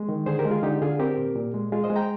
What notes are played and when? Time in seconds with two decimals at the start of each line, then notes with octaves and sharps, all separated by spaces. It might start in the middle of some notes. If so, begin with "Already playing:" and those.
Already playing: G#3
0.09 D#3
0.26 D3 G#4 C5
0.39 G4 A#4
0.45 G#3
0.51 F4 G#4
0.63 D3 D#4 G4
0.82 D3 F4 G#4
0.99 C4 G4 A#4
1.18 A#2
1.36 A#2
1.54 G#3
1.72 G#3 F4 G#4
1.84 C5 D#5
1.90 G#3
1.96 G5 A#5